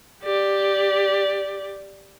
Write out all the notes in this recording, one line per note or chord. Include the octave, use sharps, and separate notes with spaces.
G4 D5